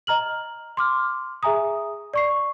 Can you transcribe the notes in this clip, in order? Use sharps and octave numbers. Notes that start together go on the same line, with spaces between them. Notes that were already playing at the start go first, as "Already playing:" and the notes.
D#5 A#5 F6 F#7
C6 D6 F6
G#4 E5 G#5 A#5 D#6
D5 C#6 C7